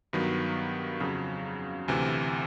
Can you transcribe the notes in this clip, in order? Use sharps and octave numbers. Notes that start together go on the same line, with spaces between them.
G2 D#3 F#3 B3
F2 C#3 F#3
D2 C3 E3